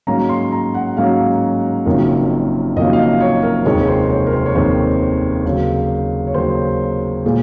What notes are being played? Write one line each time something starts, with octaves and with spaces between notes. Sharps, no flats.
G#2 F#3 A#3 C#4 A#5
C6
A#5
F#5
G#2 F#3 A#3 C#4 F5
F#1 F2 D#3 F#3 A#3
F#1 F2 D#3 F#3 A#3 D#5
F5
D#5
C#5
A#4
F1 D#2 D#3 G#3 C4 C#5
C5
C#5
A#4
C5
C#5
F1 D#2 D#3 G#3 C4 C5
D#2 C#3 F#3
C#5
D#2 C#3 F#3 C5
A#2 G#3